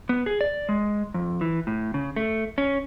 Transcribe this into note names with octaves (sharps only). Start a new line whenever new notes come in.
B3
G#4
D5
G#3
F2
E3
A2
C#3
A3
C#4